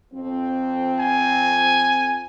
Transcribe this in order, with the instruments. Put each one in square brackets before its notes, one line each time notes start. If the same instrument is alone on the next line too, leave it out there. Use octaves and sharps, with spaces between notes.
[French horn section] F2 C4
[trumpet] G#5